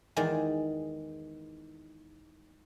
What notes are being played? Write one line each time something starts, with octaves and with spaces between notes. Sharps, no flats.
E2 D#3 G#3 D5